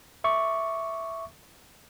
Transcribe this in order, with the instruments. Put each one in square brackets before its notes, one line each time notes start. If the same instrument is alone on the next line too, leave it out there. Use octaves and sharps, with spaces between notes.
[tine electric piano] E5 C#6 D6